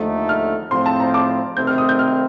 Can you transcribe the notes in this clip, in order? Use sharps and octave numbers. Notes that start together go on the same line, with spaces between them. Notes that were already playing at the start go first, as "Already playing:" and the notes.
Already playing: D#2 D3 F3 A3 D#4
F6
A2 F3 C4 C6
A5
A#5
D6
C3 D#3 A3 C4 G6
F6
D#6
G6
F6